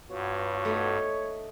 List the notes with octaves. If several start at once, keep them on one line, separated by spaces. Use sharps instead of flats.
G2 B3 F4 F#4 C#5
A3 D#4